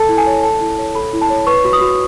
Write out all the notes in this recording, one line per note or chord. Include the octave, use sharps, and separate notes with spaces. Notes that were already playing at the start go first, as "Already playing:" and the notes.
Already playing: A4 A5
E4
G#5
C#5
A4 A5
E4
C#5
A4 B5
E4
A5
C#5
B4 C#6
F#4
D#6
F#4